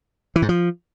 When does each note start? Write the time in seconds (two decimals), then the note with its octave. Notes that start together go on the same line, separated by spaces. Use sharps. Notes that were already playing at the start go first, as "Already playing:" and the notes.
0.36 E3
0.42 G#2
0.49 F3